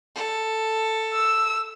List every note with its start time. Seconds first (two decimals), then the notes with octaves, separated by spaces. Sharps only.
0.15 A4
1.13 E6